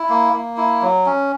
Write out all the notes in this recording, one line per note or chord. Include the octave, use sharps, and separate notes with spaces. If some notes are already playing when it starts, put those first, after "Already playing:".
Already playing: E4
A#3
A#3
E4
F#3
C#4